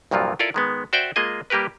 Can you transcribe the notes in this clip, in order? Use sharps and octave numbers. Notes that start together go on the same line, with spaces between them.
C2 G2 A#2 F3 F#3 F4
E4 F4 A4 A#4 D5
D#3 G#3 B3
F#4 C5 D5 E5 G5
G#3 A#3 F4 G#4 D#5 G#5
G3 A#3 G4 A#4 B4